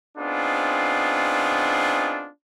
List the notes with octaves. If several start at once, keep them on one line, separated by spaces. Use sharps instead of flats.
B3 C4 D4 D#4 F4 G#4